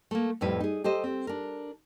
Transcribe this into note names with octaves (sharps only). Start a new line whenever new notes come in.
A3 A#3
F2 A2 G3 B4
D#4 G#4
G4 A4 C5 D#5
C4
D4 A#4